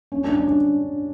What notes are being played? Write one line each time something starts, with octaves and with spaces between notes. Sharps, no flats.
C#4
D4
D4
D4